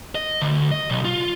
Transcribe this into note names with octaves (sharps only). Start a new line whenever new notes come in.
D#5
D2
D#5
B1
F4